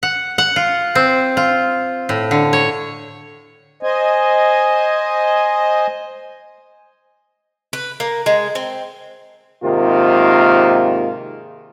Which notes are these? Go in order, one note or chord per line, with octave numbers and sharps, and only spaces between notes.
F#5
F#5
F4
C4
F4
A2
D3
C#5
C5 D#5 G#5
B4
A#3
G#3
C4
G#2 C3 D#3 A#3 F4